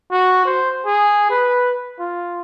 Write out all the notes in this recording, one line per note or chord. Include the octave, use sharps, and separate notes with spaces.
F#4
C5
G#4
B4
F4